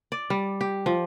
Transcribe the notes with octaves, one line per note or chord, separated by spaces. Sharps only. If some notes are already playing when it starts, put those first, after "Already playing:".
D5
G3
G4
F3